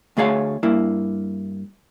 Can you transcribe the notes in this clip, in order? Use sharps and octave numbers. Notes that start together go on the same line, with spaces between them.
D2 A3 G#4 C#5 F5
G2 A#3 E4